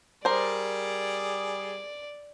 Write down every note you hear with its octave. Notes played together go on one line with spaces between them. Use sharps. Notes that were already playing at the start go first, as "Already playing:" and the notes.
G3 G#4 A#4 C5 D5